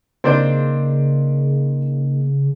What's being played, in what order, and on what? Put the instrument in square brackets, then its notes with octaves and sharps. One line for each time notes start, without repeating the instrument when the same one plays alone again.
[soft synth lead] C#3 [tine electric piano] A#3 D#4 [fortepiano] C4 D4 C5